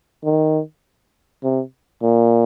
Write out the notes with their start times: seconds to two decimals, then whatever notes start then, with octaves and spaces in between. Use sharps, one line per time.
0.25 D#3
1.43 C3
2.03 A#2